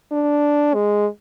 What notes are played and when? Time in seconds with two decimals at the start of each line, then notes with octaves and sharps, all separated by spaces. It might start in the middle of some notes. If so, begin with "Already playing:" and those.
0.12 D4
0.74 G#3